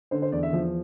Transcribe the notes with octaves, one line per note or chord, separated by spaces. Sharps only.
D3 C5
C5
E2 D5
E5
F3